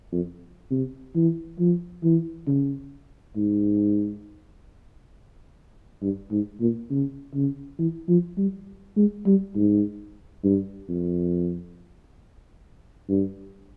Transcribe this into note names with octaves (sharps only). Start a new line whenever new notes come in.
F2
C3
E3
F3
E3
C#3
G#2
G2
G#2
A#2
C#3
C#3
E3
F3
G3
G#3
G3
G#2
G2
F2
G2